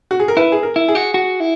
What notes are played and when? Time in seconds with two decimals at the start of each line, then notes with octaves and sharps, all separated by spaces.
0.11 F#4
0.20 G#4
0.28 A#4
0.37 E4 B4
0.52 G#4
0.63 A#4
0.76 E4
0.88 G#4
0.95 F#4
1.14 F#4
1.40 E4